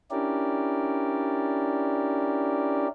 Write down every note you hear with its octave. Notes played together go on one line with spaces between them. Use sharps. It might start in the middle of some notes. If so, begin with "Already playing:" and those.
C#4 D4 E4 G4 A#4 D5